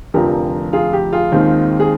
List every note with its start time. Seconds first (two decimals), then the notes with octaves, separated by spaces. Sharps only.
0.14 F1 F2 D3 F3 G4 A#4
0.73 F4 G#4
0.93 G4
1.12 F4 G#4
1.32 D#2 D#3 G#3 C4
1.80 G#4